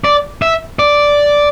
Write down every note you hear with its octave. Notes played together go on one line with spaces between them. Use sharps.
D5
E5
D5